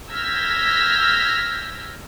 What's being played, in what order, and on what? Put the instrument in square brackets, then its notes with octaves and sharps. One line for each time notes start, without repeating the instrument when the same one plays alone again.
[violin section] E6 F6 G6 G#6 A#6 B6